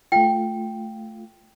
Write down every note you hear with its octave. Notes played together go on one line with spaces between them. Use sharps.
A3 F4 G5